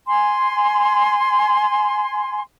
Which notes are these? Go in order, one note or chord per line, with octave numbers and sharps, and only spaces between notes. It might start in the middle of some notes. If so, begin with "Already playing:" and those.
G#5 C6